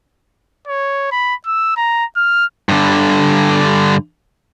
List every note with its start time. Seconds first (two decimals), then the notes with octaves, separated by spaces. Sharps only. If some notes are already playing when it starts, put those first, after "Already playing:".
0.68 C#5
1.12 B5
1.46 E6
1.77 A#5
2.16 F6
2.69 G2 D3